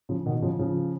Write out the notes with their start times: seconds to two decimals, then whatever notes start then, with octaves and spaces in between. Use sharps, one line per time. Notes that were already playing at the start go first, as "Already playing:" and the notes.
0.09 C#3 F3
0.26 B2 D#3
0.42 C#3 F3
0.59 C#3 F3